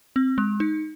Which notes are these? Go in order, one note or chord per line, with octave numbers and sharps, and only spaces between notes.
C4
G#3
D#4